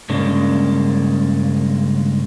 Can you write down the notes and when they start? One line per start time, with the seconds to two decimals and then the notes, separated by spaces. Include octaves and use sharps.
0.09 G2 C#3 G#3 A#3 D4